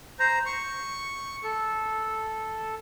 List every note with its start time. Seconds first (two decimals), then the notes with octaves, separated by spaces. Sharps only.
0.20 C5 A#5
0.46 C#6
1.44 A4